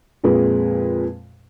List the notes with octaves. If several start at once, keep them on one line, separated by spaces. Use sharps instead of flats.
F2 A#2 G#3 B4